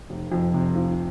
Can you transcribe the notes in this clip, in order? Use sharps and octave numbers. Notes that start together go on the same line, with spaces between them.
F1
F2
C3
F3